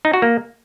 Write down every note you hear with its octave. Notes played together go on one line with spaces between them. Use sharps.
D#4
F#4
A#3